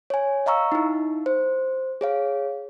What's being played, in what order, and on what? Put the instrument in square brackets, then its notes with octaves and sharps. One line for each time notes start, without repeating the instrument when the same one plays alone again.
[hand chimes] C#5 G#5
D#5 F5 A#5 C#6 E6
D#4 E4
C5
G#4 C#5 F5